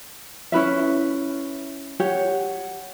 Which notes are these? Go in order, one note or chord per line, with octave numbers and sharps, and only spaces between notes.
C#4 E4 B4 E5
G4 C#5 F#5